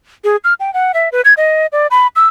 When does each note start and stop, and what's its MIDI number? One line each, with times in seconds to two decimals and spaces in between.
0.24 0.36 68
0.44 0.54 89
0.60 0.73 79
0.74 0.92 78
0.94 1.09 76
1.12 1.21 71
1.25 1.34 92
1.37 1.67 75
1.72 1.87 74
1.91 2.07 83
2.16 2.27 88